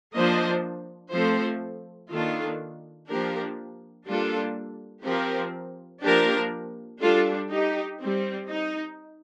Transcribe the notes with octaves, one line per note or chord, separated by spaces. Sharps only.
F3 A#3 D4 C5 D#5
F3 A3 C4 A4 C5
D#3 A#3 D4 F4 A4
F3 A#3 D4 G4 A#4
G3 A#3 D4 F4 A4
F3 C4 G4 A#4
F3 A#3 D4 G4 A#4
G3 D4 F4 A4
D#4 G4
G3 C4
D#4